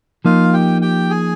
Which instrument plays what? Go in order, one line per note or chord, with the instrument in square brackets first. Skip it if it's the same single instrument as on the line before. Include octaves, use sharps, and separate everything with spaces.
[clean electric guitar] F3 A#3 D#4 [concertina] F4 F5
[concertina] G4 G5
G4 G5
G#4 G#5